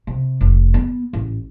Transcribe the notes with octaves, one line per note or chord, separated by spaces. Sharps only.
C3
F1
B3
A1